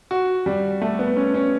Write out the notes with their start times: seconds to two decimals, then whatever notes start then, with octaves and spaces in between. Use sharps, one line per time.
0.11 F#4
0.46 G3
0.81 A3
0.99 B3
1.17 C#4
1.34 C#4